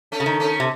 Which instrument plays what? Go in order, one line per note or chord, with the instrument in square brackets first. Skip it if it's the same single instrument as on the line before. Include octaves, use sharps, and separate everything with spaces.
[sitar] A3 C#4
[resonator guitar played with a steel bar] C#3
D#3
[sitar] A3 C#4
[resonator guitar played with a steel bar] C3